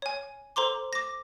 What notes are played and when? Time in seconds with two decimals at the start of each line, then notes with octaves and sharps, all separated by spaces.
0.02 C#5 G#5
0.56 A4 C5 A#5 C6 D6
0.93 D6 A#6